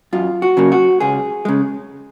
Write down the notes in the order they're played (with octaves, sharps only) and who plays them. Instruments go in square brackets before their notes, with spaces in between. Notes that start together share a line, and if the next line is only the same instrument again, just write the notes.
[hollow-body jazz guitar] F#2 F4
F#4
C#3 F#3 A#3
F#4
C#2 G#4
C#3 G#3